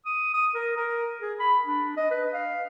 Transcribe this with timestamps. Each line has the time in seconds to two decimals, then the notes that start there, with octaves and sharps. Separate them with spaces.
0.06 D#6
0.34 D#6
0.55 A#4
0.77 A#4
1.22 G#4
1.40 B5
1.67 D4
1.97 D#5
2.11 B4
2.34 F5